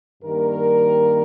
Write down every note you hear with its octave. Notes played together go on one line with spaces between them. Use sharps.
G2 D#3 G3 A#3 A#4